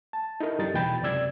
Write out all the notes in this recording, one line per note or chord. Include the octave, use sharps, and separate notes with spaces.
A5
D#4 E4 A4 A#4
F#2 G3 D#4 A6
E2 B2 G5 B5 A6
C#2 F#2 C3 D5 E6 G#6